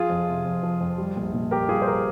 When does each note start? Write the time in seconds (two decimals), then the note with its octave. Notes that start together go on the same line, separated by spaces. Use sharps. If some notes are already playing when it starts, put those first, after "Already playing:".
Already playing: F3 F4 G#4
0.10 F2
0.28 C3
0.46 F2
0.63 F3
0.81 F2
0.98 G3
1.17 A#1
1.33 A#2
1.51 A#1 G4 A#4
1.69 G3 F4 G#4
1.82 C5
1.87 G4 A#4